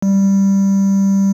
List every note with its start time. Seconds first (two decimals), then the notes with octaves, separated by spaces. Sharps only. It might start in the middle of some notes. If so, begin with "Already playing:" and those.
0.02 G3